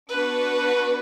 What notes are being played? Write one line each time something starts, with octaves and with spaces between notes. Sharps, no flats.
B3 D4 F#4 B4